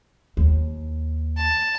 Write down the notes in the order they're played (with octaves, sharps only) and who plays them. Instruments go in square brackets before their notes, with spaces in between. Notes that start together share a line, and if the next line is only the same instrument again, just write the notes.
[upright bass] D#2
[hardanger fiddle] A5